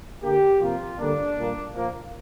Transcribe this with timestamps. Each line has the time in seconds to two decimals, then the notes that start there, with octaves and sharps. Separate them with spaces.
0.23 D3 A#3 G4
0.61 C3 F3 A#3 F4
0.98 D3 G3 A#3 D4
1.37 A#2 G3 A#3
1.75 A#2 F3 A#3